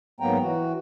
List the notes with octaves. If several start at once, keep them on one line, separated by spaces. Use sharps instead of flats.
G#2 F#3 A#3 B3 G5 A#5
E3 F#4